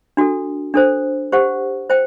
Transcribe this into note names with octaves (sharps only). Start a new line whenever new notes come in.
D4 F#4 A4
D4 A4 C5
G4 C5 F#5
C5 G5